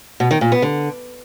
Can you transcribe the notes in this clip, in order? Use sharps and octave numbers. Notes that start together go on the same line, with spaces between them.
B2
D#3
A#2
B3
D3